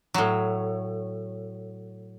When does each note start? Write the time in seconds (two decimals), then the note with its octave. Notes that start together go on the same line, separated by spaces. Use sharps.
0.14 A2 F#3